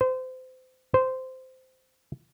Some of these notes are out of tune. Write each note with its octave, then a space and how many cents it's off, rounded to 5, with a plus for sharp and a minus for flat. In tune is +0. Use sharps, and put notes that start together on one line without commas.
C5 -30
C5 -15